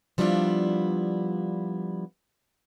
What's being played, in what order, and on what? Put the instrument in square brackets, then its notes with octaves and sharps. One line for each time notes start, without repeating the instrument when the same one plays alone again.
[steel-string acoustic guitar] F3 G3 B3 D4 E4 F4